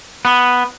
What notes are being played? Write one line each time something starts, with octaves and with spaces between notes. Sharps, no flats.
B3